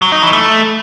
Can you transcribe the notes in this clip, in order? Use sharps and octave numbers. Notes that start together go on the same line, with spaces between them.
F#3
D#4
E3
A3